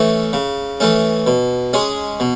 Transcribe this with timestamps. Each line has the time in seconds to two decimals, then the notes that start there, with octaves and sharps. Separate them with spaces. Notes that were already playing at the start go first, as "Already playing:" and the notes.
Already playing: E3 A3 C#4
0.33 C#3
0.80 E3 A3 C#4
1.27 B2
1.73 G#3 C#4 G#4
2.20 B2